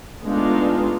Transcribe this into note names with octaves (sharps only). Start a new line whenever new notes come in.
G#3 A3 B3 D4 D#4 F4